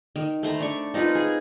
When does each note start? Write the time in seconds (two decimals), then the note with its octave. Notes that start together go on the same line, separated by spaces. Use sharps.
0.16 D#3
0.43 A3 C5 A#5 B5
0.61 D4 C#6
0.94 C4 D#4 F4 B4
1.15 G#4